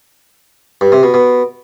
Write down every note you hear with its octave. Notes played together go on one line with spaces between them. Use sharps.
G2
C3
B2
B2